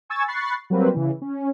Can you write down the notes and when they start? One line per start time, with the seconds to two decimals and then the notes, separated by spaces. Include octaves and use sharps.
0.09 G#5 C#6 E6 G#6 A6
0.28 B5 C#6 F#6 A6 C7
0.70 F#3 G3 A#3 C4 B4
0.94 C#3 E3
1.22 C#4